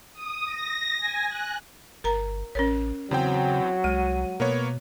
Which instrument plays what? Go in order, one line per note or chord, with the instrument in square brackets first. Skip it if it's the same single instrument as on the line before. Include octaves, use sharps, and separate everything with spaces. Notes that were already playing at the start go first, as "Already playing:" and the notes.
[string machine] D#6
A#6
G#5
F#6
[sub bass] G1 [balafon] A#4 A#5
[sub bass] A1 [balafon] C#4 A#4 C#5
[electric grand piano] E2 C4 G5 [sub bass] C#3 [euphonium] F#3
[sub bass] C2 [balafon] G#3 [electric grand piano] D#7
[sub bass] B2 [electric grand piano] A#3 B3 C#5